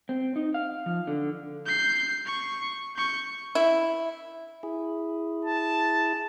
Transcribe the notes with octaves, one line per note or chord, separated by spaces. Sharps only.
C4
D#4
F5
F3
D3
G6 C7
C#6
C#6 G6
E4
E4 G#4
A5